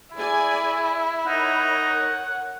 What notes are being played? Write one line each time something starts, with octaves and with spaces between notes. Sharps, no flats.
E4 G#4 D5 G#5
D#4 A#4 C#5 F#5